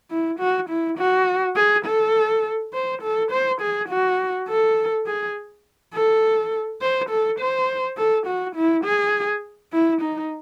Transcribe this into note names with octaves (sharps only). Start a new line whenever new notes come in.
E4
F#4
E4
F#4
G#4
A4
C5
A4
C5
G#4
F#4
A4
G#4
A4
C5
A4
C5
A4
F#4
E4
G#4
E4
D#4